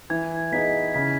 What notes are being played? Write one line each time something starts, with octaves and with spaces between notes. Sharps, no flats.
E3 G#6
B3 D#4 G#4 D#5 B6
C#3 B6